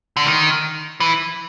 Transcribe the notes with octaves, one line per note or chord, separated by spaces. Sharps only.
D3
D#3
E3